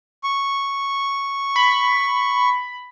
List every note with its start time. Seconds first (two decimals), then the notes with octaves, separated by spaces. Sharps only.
0.23 C#6
1.56 B5